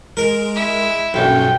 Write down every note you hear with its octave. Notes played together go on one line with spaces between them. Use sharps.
G#3 A#4 D7
E4
B1 G2 A#2 C#4 G5